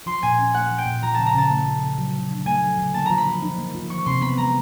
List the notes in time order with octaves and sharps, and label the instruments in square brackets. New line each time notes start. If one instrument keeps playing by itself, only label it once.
[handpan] F3 [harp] C6
[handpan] A#2 [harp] G#5
[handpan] C#4
[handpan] A3 [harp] F#5
[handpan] F3
[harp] G5
[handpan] A#2
[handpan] F3 [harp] A#5
[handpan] C#3 [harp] A5
[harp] A#5
[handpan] C#3 [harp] A5
[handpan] A3
F3
C#3
F#3
D3
D4
[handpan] A3 [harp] G#5
[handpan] F#3
D3
[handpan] A#3 [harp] A5
[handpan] F3 [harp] A#5
[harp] B5
[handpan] F3
D#4
A#3
F3
[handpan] E3 [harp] C#6
[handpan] C3 [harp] C6
[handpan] B3 [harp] B5
[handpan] G#3 [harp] A#5